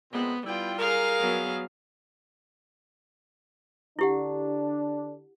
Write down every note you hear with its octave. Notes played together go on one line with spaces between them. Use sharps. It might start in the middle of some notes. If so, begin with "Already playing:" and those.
A#2 G#3 B3 C4
G3 B3 E4 F4 G5
G#4 A#4 F5
F#3 B3
D3 D4 E4 G4 F#5